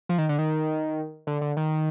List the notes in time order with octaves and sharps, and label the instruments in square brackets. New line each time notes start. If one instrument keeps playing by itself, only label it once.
[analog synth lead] F3
D#3
D3
D#3
D3
D3
D#3